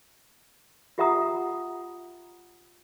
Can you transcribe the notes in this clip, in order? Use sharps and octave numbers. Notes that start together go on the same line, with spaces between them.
F4 G4 E5 F#5 A#5 D#6